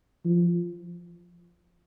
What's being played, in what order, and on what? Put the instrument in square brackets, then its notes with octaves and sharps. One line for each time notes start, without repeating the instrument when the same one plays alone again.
[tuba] F3